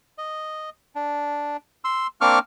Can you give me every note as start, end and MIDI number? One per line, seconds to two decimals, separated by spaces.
0.18 0.70 75
0.95 1.57 62
1.84 2.07 84
1.84 2.07 88
2.21 2.39 58
2.21 2.39 60
2.21 2.39 62
2.21 2.39 85
2.21 2.39 86
2.21 2.39 89